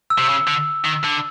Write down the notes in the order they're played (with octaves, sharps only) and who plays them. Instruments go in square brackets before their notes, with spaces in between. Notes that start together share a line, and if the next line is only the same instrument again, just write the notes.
[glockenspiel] E6
[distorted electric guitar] C3
C#3
D3
D#3
D3